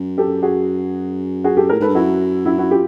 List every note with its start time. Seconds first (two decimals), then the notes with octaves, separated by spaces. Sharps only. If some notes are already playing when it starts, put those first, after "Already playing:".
Already playing: F#2
0.18 G4 A4
0.42 F#4 G#4
1.44 F#4 G#4
1.57 G4 A4
1.69 A2 G#4 A#4
1.80 G#2 A4 B4
1.88 G2
1.95 F#2 E4 F#4
2.45 E4 F#4
2.58 E4 F#4
2.71 F4 G4